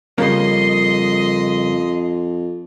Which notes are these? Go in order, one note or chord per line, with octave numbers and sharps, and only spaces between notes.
F2 C#3 G3 A#3 D#5 C6